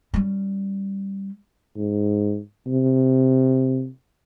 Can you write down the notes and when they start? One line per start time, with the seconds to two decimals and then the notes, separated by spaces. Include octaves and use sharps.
0.14 G3 C#4
1.77 G#2
2.66 C3